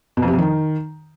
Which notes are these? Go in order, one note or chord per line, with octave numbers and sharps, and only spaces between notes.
B2
F2
C3
F2
D#3